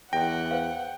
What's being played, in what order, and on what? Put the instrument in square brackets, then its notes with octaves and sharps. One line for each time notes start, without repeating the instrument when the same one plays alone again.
[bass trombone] E2 [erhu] F#5 [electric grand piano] G5 [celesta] A#6
[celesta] B4 C5 F5